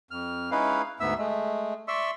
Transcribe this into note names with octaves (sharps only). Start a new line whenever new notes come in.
F2 F6
G#3 C#4 D#4 E4 B4 F5
D2 G#2 B3 E5 E6
G#3 A3
D5 E5 C6 C#6 E6